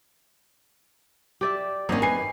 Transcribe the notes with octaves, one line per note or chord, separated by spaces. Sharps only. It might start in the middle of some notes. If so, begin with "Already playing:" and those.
G4 D5 E5
G#1 A#3 C4 C#4 D#5
B4 G#5 C7